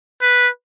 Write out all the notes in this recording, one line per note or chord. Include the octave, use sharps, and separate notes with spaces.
B4